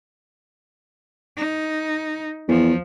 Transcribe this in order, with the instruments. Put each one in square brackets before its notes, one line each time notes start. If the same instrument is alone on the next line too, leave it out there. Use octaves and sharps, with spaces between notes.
[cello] D#4
[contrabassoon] E2 [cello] F3